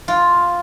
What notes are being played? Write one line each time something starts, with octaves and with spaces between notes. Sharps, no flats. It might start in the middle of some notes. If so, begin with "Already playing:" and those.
F4